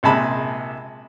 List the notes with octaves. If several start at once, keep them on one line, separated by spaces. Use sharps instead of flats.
A#1 C3 G#3 A5 B5